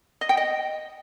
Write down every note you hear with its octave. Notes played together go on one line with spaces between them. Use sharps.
D#5
G5
D#5